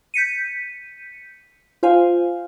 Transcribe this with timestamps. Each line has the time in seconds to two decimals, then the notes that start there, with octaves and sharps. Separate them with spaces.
0.14 G6 B6 C#7 D#7
1.83 F4 C5 F5 G#5